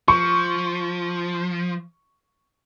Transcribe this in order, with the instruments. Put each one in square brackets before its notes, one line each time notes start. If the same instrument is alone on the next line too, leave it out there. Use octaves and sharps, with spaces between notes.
[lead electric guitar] F3 [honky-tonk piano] C#6